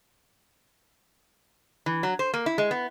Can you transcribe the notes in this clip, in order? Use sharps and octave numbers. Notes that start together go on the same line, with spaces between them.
E3
F#3
C5
A#3
E4
G#3
B3